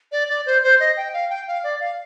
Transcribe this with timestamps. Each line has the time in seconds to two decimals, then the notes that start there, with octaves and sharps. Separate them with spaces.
0.12 D5
0.29 D5
0.46 C5
0.63 C5
0.80 D#5
0.97 G5
1.13 F5
1.30 G5
1.48 F5
1.64 D5
1.80 F5